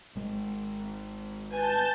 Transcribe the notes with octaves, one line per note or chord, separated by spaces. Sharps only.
G#1 G#3
B4 G#5 A5 G6